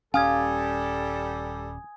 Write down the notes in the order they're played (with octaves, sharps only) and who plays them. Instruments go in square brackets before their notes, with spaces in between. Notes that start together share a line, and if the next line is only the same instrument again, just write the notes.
[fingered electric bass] D#1 C#4 [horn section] G3 A4 [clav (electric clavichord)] F5 [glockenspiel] G#5 D#6 G#6